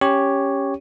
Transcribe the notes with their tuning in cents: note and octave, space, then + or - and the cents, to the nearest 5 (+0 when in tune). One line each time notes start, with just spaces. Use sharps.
C#4 +0 G4 +5 C#5 +0